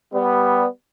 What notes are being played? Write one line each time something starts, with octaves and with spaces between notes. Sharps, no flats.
G3 B3